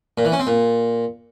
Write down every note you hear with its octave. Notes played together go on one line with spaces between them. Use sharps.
A#2
E3
C#4
C4
A#2